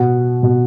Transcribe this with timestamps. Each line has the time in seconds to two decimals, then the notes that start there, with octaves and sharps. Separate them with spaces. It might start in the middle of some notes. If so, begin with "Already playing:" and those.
Already playing: B2 F#5
0.43 B2